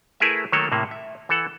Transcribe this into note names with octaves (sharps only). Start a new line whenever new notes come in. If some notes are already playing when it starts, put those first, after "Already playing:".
A3 E4 G#4 A#4 B4 E5
D#3 F#3 A3 A#3 A4 C#5
A2 C3 A#3
E5
E3 A4 F#5